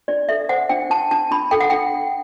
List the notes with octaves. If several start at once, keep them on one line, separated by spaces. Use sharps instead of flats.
D4 D5
A4 E5
C5 F#5
D4 G5
D4 A5
D4 A5
D4 B5
A4 G5
F#5
D4 G5
D4